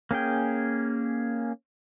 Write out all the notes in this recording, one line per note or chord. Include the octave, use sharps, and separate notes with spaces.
A#3 C#4 G#4 G5